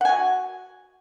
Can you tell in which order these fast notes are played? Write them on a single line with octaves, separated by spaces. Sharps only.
F#5 G#5 F#4